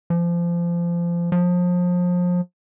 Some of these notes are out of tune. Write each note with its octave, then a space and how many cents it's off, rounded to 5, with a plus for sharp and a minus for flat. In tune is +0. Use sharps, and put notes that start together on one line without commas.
F3 -25
F3 +30